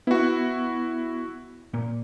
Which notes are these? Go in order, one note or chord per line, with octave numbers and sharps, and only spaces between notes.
B3 E4 F#4 F#5
A#2